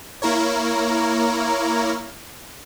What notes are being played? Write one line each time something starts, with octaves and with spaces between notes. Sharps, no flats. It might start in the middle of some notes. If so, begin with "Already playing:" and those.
A#3 E4 A#4 C#5